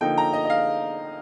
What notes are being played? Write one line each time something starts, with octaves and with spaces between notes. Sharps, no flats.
D3 F3 A#3 D#4 G5
A#5
D#5
D#5
F5